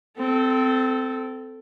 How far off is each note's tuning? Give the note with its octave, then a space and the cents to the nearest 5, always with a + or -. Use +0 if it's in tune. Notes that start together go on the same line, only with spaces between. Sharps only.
C4 -20 A4 +0